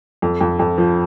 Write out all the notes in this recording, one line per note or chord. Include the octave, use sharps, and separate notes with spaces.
F2
F2
F2
F3